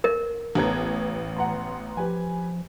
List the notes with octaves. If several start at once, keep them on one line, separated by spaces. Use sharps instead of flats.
A#4
A1 E3 B3 A4 C#5 A#5 G#6
F#5 A#5 C6
F3 G4 B4 G#5